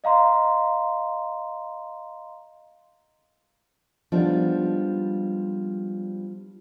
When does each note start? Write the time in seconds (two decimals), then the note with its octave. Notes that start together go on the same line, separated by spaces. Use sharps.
0.04 D#5 F5 A#5 C6
4.12 F3 G3 G#3 B3 D4 D#4